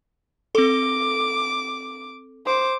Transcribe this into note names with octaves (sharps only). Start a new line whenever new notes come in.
C4 A4 D6
C5 D6